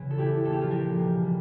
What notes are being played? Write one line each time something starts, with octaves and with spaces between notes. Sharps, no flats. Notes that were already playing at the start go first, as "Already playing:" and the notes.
Already playing: E2 C#3
A4
A#1 E4 G4
A#1 A4
G4
F4 A4
F3 G4 A#4
E1
G3